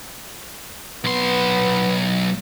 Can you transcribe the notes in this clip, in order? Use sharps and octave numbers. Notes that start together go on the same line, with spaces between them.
B1 B3 C6